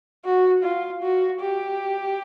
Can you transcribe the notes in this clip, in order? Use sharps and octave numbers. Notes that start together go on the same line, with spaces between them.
F#4
F4
F#4
G4